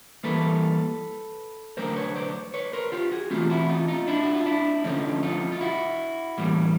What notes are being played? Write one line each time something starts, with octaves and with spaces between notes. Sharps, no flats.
E3 G3 A#3 A4 B4
D3 F#3 A3 A#4 C5
B4 C#5
C5 D5
B4 C#5
A#4 C5
F4 G4
F#4 G#4
E3 A3 C4 F4 G4
E4 F#4
D#4 F4
D#4 F4
D4 E4
F#4
F4
D4 E4
D3 F3 A3 C4 C#4 D#4
D#4 F4
F4
E4 F#4
A2 E3 G3 A#3